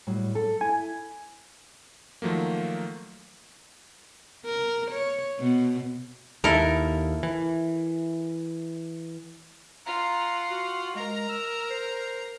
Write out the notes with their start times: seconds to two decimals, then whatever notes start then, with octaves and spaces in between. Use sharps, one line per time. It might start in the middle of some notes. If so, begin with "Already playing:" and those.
0.07 A2 F#3 G3
0.35 A4
0.61 E4 G#5
2.22 D#3 F3 F#3 A3 A#3
4.45 A#4
4.91 C#5
5.39 B2
6.44 D#2 E4 A4 A#4
7.23 E3
9.86 F4 F#5 A#5
10.51 F#4
10.95 G#3 A#4 A#5
11.29 E6
11.70 C5